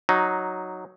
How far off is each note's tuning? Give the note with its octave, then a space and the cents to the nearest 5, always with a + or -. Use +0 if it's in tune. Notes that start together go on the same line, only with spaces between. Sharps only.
F#3 +0 D#4 +0